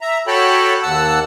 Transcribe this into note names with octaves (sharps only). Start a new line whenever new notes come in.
E5 A#5
F#4 A4 C#5 G5 A5 B5
D#2 F#5 A5 E6